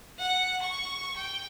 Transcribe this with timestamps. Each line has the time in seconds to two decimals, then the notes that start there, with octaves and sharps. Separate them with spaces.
0.19 F#5
0.62 C#6
1.16 G5